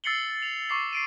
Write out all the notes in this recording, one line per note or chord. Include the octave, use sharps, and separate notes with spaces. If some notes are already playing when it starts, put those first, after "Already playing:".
E6 A6 C7 C#7 F#7 G7
F7
C#6 D6 C7
C7 D7 D#7